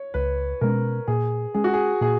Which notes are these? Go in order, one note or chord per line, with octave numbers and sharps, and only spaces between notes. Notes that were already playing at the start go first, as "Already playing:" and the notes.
Already playing: C#5
C#2 B4
B2 G#3 C#4 A#4
A#2 G#4
G#3 C#4 G#4
F#4
G#4
A#2 G#4